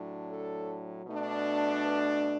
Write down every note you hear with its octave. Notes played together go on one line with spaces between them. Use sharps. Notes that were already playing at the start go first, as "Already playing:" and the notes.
Already playing: A2 F#3 D4
A4
B2 A3 D4
B4